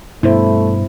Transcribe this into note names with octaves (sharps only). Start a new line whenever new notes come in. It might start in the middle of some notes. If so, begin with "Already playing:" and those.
G2 B2 G3 A3 B3 E4 C5